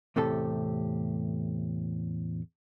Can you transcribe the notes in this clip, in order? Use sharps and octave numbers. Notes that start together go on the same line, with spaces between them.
E2 A2 C3 G4 A4 A5